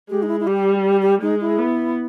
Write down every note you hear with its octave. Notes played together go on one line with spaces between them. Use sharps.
G#3 G4
D#4
E4
E4
G3 G4
G4
G4
G#3 D#4
E4
B3